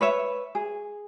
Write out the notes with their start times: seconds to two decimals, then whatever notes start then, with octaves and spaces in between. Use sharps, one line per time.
0.01 B4 C#5 E5
0.55 G#4